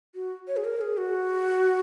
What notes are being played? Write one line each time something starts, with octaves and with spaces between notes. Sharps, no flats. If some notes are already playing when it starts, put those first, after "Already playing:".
F#4
C#5
G#4
A#4
G#4
F#4